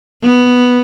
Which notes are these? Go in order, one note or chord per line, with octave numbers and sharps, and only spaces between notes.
B3